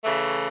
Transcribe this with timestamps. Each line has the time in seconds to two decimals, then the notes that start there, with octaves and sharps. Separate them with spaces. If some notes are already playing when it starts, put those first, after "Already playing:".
0.03 C#3 E3 A3